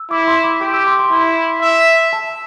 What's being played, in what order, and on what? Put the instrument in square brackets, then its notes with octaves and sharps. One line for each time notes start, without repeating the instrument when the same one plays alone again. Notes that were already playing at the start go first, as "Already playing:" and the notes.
Already playing: [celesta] E6
[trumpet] E4 [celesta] D6
[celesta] C6
D6
[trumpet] G4 [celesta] D6
[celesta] E6
C6
C6
[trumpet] E4 [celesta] C6
[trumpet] E5
[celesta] A5